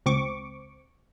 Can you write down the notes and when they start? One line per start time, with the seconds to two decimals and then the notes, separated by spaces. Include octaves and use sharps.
0.06 C#2 C4 C#6 D6